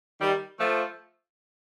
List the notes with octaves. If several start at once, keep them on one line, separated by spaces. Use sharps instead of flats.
D#3 G3
F3 A3